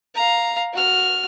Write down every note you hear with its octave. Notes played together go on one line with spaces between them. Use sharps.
F5 A#5
F#4 F6